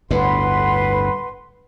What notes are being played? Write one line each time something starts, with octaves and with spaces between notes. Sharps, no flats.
G1 D2 A2 B4 F#5 C6